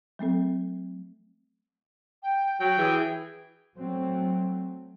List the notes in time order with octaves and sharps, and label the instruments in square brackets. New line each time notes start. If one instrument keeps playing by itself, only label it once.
[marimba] F#3 A3 C4 A4
[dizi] G5
[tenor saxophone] F#3 [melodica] G5
[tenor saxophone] E3 [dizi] G#4
[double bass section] F#3 A3 C4